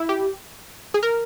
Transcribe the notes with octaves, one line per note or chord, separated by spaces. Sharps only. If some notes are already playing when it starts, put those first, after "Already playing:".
Already playing: E4
G4
G#4
A#4